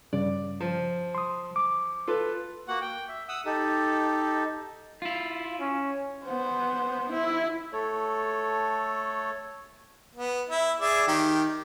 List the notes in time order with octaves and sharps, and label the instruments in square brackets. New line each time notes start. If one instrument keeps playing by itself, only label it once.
[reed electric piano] G2 C#3 [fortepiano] D5
[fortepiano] F3
[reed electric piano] C6 D#6
D6
[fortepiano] F4 A4 B4
[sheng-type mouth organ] A#3 F#4 F#5
G5
E5
F#5 D#6 E6
D#4 G4 A4
[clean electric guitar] E4 F4
[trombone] C#4
[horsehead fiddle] B3 C5
E4
[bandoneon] A3 A4 C#5
[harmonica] B3
E4
G#4 D5 E5
D#3 G4